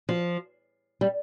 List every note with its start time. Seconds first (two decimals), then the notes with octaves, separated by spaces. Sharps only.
0.09 F3
1.01 G3